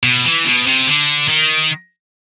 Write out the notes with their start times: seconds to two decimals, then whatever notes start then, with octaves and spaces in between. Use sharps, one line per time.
0.03 B2
0.24 E3
0.45 B2
0.67 C3
0.87 D3
1.28 D#3